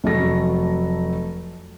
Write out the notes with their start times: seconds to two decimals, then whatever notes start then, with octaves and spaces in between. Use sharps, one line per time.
0.04 F1 F#3 A3 A4 A#6